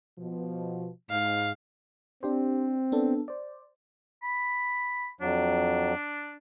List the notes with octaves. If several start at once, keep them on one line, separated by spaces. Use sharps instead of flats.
B2 F3
G#2 F5
C4 D4 G4 C5
B3 D4 A4
C5 D5
B5
F2 F#3 D4